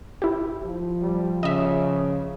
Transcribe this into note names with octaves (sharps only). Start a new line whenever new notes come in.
E4 G4
F3
G3
C#3 D#5 E5